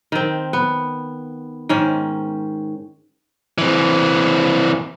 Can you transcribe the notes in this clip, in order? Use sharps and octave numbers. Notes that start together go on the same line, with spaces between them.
D#3 C4
B3
G#2 D#3 C#4
E3 C4